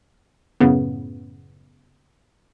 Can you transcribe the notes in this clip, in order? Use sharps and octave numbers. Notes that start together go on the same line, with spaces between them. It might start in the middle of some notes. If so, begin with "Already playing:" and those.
F#2 A2 C#3 B3